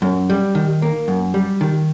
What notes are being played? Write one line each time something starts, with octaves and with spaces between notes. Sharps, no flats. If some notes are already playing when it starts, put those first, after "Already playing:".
F#2
G3
D#3
A#3
F#2
G3
D#3